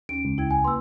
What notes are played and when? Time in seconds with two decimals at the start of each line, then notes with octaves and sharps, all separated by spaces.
0.09 D#2 C#4 D7
0.25 C#2
0.38 E4 G5 G#6
0.51 G#5
0.64 A#3 B4 C6 E6